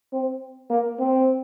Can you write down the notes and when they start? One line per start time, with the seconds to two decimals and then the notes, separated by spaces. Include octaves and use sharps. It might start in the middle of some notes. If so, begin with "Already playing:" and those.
0.13 C4
0.70 A#3
0.99 C4